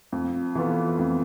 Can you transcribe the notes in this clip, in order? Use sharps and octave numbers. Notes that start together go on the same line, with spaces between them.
F2
E3 B3 F4 A4
F2